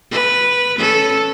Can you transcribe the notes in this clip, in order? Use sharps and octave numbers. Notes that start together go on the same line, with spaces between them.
B4
C#4 A4